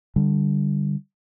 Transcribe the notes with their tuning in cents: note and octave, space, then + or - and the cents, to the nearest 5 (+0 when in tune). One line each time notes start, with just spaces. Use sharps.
D3 +0 G3 +0